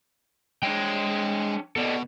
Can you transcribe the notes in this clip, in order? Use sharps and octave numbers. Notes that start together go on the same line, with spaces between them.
G#3 D4 C#5 G5
B2 A4 D5 D#5